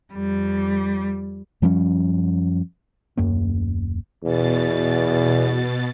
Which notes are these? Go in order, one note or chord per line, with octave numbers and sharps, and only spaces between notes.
F2 G3
F#2 F3 G3 C#4
D#1 F#2 A#3 C#4
E2 B2 A6